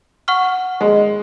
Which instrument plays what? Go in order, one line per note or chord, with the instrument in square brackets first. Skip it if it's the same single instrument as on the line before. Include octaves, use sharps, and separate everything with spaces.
[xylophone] F#5 C#6 F6
[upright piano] G#3